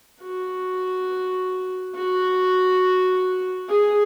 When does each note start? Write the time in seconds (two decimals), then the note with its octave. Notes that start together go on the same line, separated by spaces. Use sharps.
0.21 F#4
1.95 F#4
3.69 G#4